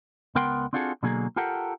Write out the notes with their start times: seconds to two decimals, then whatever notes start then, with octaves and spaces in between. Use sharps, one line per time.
0.35 C#2 B3 A#4 F#5 G5 C6
0.73 C4 D4 F4 F#4 G#4 A4
1.03 B2 D3 F#3 A#3 G#4
1.36 F4 G4 A4 A#4 F#5